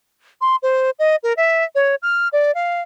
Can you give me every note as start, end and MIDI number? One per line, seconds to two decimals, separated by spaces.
0.41 0.56 84
0.63 0.90 72
0.99 1.16 75
1.23 1.33 70
1.37 1.64 76
1.75 1.95 73
2.02 2.28 89
2.33 2.54 74
2.55 2.81 77